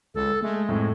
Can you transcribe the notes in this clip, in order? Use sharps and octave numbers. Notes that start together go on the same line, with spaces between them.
C#2 A4
G#3 A3
F2 A2